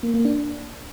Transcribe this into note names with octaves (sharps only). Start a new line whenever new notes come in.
A#3
A#3
D4